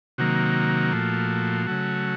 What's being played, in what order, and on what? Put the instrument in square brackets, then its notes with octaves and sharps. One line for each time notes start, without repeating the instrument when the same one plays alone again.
[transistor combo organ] C3 D#3 F#3 A#3 F#4
A#2 F3 A3
C#3 F#3 A3